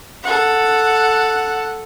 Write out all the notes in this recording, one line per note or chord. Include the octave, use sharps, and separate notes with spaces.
A4 F#5